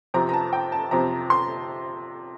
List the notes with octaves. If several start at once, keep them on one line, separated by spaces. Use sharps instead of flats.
F2 C3 F3 C4 A#5
A#5
A5
G5
A5
F2 C3 F3 C4 A#5
C6